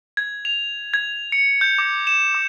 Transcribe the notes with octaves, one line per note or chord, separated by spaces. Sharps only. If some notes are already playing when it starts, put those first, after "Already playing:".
G#6
F7
G#6
C#7
G6
D6
E7
D6